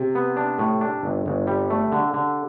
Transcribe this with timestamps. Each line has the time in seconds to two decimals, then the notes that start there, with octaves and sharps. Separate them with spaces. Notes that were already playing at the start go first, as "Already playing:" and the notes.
Already playing: C3
0.15 B3
0.37 D4
0.59 A2
0.81 D4
1.03 G1
1.26 G1
1.47 G3
1.70 A3
1.92 D3
2.14 D3